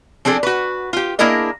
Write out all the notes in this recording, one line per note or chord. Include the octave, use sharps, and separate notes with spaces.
F3 C4 D4 G#4 A4
F#4 B4
F4 G4
A#3 D4 E4 G#4 A#4 D#5